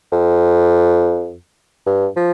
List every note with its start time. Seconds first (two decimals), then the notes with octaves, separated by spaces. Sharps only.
0.12 F2
1.87 G2
2.16 F3